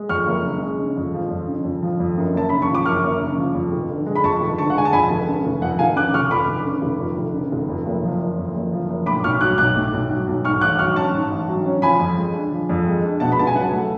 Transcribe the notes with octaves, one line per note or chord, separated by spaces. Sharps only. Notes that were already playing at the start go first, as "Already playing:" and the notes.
Already playing: G#3
F2 C#6 F6
F#1
C#3
G#3
C#3
F2
F3
F2
C#3
F2
F3
F2
F#2
F#1 A5
C#3 B5
C#6
F3
D6
F#2 C#6 F6
F#1
C#3
F3
F2
F1
D3
G#3
B5
F2 A5 C#6
F1
D3 A5 C#6
F#5
G#3 G#5
A5
F2 G#5 B5
F1
C#3
F1
F2 F#5
F1 F5 G#5
C#3 D6 F#6
F1 C#6 F6
F2 B5 D6
F1
C#3
F1
F2
F1
C#3
F1
F2
F#1
F3
F#1
F2
F#1
F3
F#1
A2 B5 D6
B1 C#6 F6
F#3 D6 F#6
B1 D6 F#6
A2
B1
F#3
B1
G#2 C#6 F6
A1 D6 F#6
F#3 C#6 F6
C#4 A5 C#6
G#2
A1
F#3
C#4
F3 G#5 B5
F2
G#3
D4
F3
F2
G#3
D4
B2 F#5 A5
B5
C#2 A5
G#5
F#3 F#5
A3